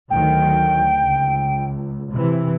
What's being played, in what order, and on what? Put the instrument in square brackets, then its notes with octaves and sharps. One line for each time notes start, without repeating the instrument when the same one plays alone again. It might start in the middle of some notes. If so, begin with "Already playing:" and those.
[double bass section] D2 D#3 F#3 [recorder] G5
[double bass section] C#2
C3 E3